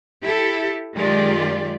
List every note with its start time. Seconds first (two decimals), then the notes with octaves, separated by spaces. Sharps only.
0.22 E4 G4 A4
0.96 F#2 D#3 G#3 F4 G4 D5